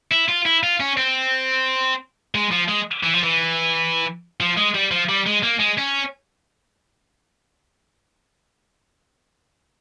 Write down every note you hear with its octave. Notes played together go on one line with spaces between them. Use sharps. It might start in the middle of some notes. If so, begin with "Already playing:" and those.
E4
F4
E4
F4
C#4
C4
G#3
F3
G#3
E3
F3
E3
F3
G#3
G3
F3
G3
G#3
A#3
G#3
C#4